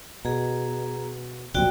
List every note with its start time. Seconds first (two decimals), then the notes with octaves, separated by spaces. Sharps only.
0.25 B2 G#4 A#5
1.54 D1 A#1 C3 F#4 D5 G5